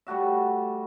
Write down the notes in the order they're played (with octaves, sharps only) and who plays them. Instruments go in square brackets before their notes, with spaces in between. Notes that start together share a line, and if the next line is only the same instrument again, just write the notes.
[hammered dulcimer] G3 A3 F#4 E5